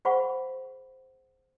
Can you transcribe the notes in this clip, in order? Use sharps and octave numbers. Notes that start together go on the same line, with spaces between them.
G#4 C5 F5 F#5 B5 C#6